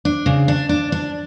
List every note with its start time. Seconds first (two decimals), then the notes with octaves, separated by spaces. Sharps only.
0.05 D4
0.26 C#3
0.48 D4
0.69 D4
0.92 D4